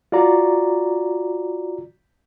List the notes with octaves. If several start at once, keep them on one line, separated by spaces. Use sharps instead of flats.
F4 F#4 D5 A#5